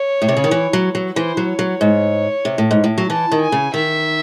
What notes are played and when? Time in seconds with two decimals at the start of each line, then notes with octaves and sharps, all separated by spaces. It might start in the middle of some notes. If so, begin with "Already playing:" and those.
Already playing: C#5
0.22 A2
0.28 C3
0.37 C#3
0.44 D#3
0.51 E3
0.73 F#3
0.95 F#3
1.16 E3 C5
1.37 F#3
1.49 C#5
1.59 F#3
1.81 G#2
2.45 C3
2.58 A2
2.71 G#2
2.84 A2
2.98 F#3
3.10 E3 A5
3.32 D#3
3.41 G#5
3.52 C#3
3.74 D#3 E5